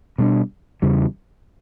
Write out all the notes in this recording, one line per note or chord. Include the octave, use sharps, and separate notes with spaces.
B2 G3 B3 D4
E2 C#3 E3 G3